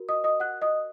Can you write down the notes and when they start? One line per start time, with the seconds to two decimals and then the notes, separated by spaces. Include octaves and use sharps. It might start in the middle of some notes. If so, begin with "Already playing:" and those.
Already playing: F#4 A#4
0.09 D#5 D#6
0.24 D#5 D#6
0.40 F#5 F#6
0.62 D#5 D#6